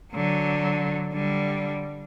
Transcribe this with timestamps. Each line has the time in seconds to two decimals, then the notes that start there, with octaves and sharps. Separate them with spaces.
0.13 D3 F#3
1.13 D3 G3